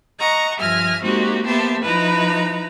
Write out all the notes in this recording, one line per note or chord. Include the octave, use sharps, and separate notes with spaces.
D#5 F#5 A#5 C#6
G2 F3 E5 G#5 F6 A#6
G#3 A#3 C4 D#4 F#4 G4
A#3 B3 G4 C5 E5 A5
F3 D#4 E4 B4 A#5